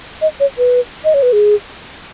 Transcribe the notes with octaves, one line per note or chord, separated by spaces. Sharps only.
D#5
C#5
B4
D#5
C#5
B4
G#4